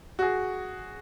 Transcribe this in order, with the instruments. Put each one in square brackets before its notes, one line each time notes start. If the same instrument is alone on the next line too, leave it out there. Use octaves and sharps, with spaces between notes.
[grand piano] F#4 G#4